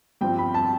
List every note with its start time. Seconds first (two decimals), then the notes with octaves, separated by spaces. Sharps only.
0.21 G2 F3 C4 G5
0.38 B5
0.54 A5